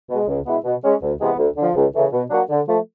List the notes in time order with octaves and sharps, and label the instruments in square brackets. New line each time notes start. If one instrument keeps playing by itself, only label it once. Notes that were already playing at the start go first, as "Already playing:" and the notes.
[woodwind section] B2 G#3
C#2
B2 G#3 B3 E4
B2
G#3 C#4
D2
C3 E3 G#3 B3
D2
D3 F3
C#2
C#3 E3 A3
B2
F#3 A#3 D4 F#4
D3
F3 A3